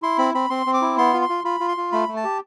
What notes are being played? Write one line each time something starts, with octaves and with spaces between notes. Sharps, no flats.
E4 C6
C4 B5
C4 B5
C4 C6
C4
D6
E4
B3 C6
F4
C6
F4
F4 B5
F4
C6
F4
A3 B5
A3
A5
G4